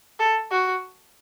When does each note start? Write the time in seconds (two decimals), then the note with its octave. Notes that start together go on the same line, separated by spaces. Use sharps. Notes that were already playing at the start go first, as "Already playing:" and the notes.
0.19 A4
0.51 F#4